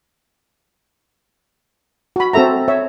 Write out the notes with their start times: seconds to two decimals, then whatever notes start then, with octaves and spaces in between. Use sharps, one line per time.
2.16 F#4 B5
2.33 C4 F#4 A4 E5 A#5
2.68 C#5 E5